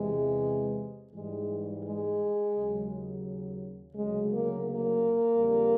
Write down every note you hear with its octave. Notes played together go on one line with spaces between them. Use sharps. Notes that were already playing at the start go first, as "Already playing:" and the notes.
Already playing: E2 C3 E3 G#3
G#2 E3 G3 G#3
G#3
D#2 C#3 F#3
D2 C#3 F#3 G#3
A#3
A#3
F2 D3 G3